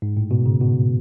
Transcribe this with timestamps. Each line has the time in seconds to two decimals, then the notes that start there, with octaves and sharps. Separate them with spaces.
0.02 G#2
0.17 A2
0.31 B2
0.46 C#3
0.61 B2